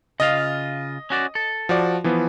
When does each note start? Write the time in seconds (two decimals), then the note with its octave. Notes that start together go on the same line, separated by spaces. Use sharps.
0.20 C#3 F4 D#5 F5
1.10 C#4 F#4 D5
1.35 A4
1.69 F3 F#4 D5
2.04 E3 F3 B3